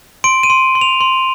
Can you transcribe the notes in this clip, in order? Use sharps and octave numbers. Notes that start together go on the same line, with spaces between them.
C6 D7
D#7
C6
C6
F7
C6